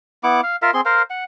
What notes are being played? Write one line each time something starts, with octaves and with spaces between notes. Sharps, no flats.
B3 E4 F#5 D6
F5
F4 A#4 E5 F5
C4 G#4 C6
A#4 C5 F5
F#5